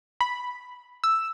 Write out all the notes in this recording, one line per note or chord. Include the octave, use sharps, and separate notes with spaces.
B5
E6